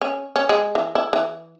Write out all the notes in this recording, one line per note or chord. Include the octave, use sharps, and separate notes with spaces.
C#4
C#4
G#3
E3
E4
E3